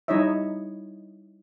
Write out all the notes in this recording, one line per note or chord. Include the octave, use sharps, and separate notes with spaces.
G3 D#4 E4 C#5 D#5 E5